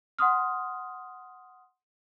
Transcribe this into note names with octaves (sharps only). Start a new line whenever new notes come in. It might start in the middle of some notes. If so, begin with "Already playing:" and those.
F#5 C6 D#6 F6